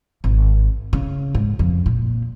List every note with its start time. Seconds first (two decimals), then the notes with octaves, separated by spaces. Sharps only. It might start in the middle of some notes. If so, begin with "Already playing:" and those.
0.24 G#1
0.93 C#3
1.35 G#2
1.59 F2
1.86 A#2